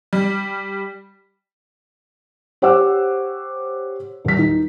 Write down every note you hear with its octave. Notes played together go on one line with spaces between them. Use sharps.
G3
G4 C5 C#5 F#5 D6 E6
D#1 B6
D#4